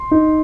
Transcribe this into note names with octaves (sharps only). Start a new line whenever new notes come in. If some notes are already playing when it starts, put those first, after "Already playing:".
Already playing: C6
D#4